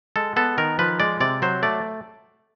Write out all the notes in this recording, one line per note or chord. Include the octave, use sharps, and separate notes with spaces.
G#3 A4
B3 A4
D#3 A#4
F3 B4
G#3 D5
C3 D5
F#3 C5
A3 D5